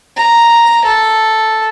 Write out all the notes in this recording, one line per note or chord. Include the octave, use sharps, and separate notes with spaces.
A#5
A4